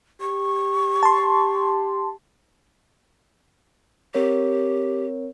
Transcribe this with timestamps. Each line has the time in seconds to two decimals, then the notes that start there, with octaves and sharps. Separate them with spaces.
0.21 G4 C#6
1.03 A5 C6
4.15 C4 G4 A#4 C#5